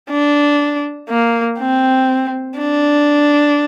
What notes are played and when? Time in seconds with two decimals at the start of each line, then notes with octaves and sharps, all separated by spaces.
0.10 D4
1.09 A#3
1.59 C4
2.58 D4